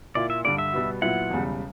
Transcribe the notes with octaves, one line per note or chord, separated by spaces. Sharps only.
A#2 A#3 E4 D5
E5
G2 D3 G3 D5
E5
B2 G3 B3 F#4
A#2 F#3 B3 E4 F#5
E1 E2 C#3 G3